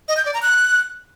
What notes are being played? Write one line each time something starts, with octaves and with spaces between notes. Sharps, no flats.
D#5
G6
D5
A#5
F#6